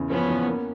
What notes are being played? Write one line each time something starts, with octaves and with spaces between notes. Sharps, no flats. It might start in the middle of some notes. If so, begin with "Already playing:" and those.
Already playing: E2 C#3
F3 B3 C#4
E2
A#3